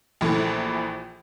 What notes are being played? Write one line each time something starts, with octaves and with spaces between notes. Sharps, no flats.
A#1 E3 A3